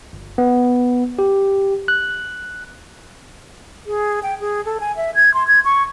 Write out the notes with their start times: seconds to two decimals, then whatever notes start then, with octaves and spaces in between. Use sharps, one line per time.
0.13 G1
0.38 B3
1.19 G4
1.88 F#6
3.87 G#4
4.23 G5
4.41 G#4
4.65 A4
4.80 G#5
4.96 E5
5.15 G#6
5.34 C6
5.48 G#6
5.65 C#6